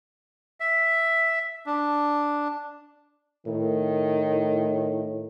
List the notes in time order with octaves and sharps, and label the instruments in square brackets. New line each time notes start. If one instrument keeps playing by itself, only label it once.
[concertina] E5
D4
[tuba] A2 [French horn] D#3